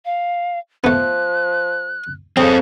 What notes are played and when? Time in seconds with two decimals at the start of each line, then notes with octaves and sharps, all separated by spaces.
0.05 F5
0.84 F3 A3 B3 F#6
2.37 C#3 C4 A4 G5 D#6